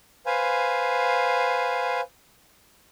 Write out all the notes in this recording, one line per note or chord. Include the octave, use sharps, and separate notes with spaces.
B4 C5 F5 G#5